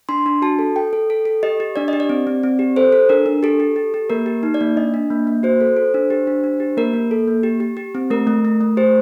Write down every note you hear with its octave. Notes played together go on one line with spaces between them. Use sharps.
D4 C6
D4
F#4 A5
A4
A4 G5
A4
A4
A4
G4 D#5
G4
D4 D5
G4 D#5
D5
C4
C4
C4
G4
A4 C5
A4
D4 A#4
D4
G4 A4
G4
G4
G4
A#3 A#4
G4
D#4
D5
A#3
D4 D#5
D4
A#3
A#3
F#4 C5
A4
A4
D4
G4
D4
D4
G4
A#3 A#4
A#3
A4
A#3
G4
G4
G4
C4
A3 A#4
A3
A3
A3
G4 C5